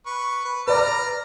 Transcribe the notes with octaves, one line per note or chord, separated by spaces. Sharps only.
B4 C#6
B4
B4 D5 A#5 F6